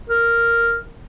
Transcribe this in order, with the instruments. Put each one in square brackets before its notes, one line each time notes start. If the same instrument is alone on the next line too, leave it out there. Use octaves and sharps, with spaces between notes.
[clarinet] A#4